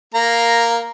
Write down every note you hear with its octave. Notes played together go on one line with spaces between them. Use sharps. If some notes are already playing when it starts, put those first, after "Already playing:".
A#3 A#5